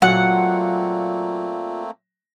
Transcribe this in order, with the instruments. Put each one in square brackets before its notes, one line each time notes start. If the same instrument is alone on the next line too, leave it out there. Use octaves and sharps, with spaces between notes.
[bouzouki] A#2 F4 [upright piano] F#3 [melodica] A3 A#3 C4 [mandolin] F#5